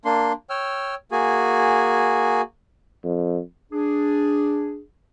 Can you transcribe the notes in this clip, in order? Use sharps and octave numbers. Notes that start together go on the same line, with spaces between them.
A#3 D4 C6
C#5 G5 E6 F6
A#3 F#4 G#4 G#5
F2
D4 G#4